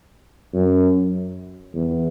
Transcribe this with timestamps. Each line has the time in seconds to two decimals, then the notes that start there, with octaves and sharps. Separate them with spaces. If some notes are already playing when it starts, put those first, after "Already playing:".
0.53 F#2
1.74 E2